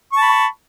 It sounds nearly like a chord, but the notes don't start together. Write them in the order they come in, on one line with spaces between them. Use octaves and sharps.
C#6 A5 B5